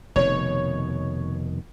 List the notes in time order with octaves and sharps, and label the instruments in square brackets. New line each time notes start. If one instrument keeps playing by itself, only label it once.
[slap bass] F1 B2 D#3 [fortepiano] C#5